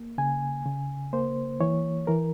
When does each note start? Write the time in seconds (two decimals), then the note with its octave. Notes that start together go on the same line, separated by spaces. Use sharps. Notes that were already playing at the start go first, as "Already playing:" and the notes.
Already playing: A#3
0.18 C#3 G#5
0.65 C#3
1.13 A#3 C5
1.60 E3 C#5
2.07 E3 A#4